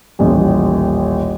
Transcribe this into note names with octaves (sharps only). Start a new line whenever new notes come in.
D#1 A1